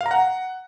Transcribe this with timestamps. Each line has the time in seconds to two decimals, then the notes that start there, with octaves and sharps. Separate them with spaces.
0.01 F5
0.06 A#5
0.11 F#5